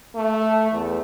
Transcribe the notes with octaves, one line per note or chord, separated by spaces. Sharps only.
A3
E2